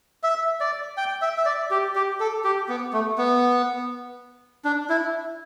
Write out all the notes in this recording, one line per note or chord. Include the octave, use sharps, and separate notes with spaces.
E5
D5
G5
E5
E5
D5
G4
G4
A4
G4
B3
A3
B3
D4
E4